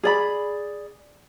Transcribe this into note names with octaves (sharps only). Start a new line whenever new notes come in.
G#4 D5 B5